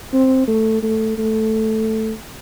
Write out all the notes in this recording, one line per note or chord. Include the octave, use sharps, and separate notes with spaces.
C4
A3
A3
A3